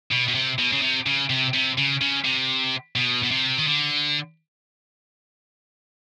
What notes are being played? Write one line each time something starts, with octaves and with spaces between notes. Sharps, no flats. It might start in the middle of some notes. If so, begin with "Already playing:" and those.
B2
B2
C3
B2
C#3
C3
C#3
C3
C3
C#3
C#3
C3
B2
B2
C3
D#3
D3